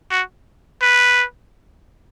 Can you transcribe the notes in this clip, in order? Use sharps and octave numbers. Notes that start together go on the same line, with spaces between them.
F#4
B4